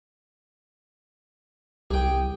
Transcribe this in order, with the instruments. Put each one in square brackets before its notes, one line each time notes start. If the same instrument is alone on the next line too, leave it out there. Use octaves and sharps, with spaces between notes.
[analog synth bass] C2 [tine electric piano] G4 [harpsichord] G#4 G5